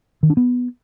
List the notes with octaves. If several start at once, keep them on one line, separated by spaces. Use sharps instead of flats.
D#3
D4
B3